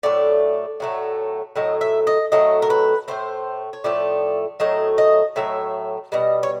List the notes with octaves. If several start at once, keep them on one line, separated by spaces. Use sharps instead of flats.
A2 F#3 A3 D5
A2 F#3 A3
A2 F#3 A3 D#5
E5
D#5
A2 F#3 A3 D#5
A#4
B4
A2 F3 A3 C5
C#5
A2 F3 A3 D5
A2 F#3 A3 D#5
D#5
A2 F#3 A3 E5
B2 G3 D#5
C#5